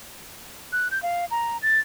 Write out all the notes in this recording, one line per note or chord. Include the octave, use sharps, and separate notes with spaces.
F#6
G6
F5
A#5
A6